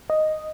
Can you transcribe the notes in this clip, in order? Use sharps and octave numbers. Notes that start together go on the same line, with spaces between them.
D#5